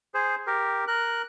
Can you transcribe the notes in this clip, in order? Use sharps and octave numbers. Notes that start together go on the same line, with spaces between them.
G#4 C5
G4 A#4
A#4 F#6